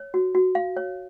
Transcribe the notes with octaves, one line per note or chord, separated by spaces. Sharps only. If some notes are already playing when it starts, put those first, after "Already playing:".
Already playing: C#5
F#4
F#4
F5
C#5